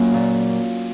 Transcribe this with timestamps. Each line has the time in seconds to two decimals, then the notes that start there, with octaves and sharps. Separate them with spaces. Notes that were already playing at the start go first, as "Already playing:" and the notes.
Already playing: F#3 A#3 C#4 F4
0.14 A#2